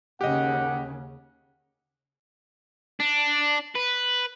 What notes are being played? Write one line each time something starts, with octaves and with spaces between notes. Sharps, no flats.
D#2 C#3 G4 D#5 F#5
D4
B4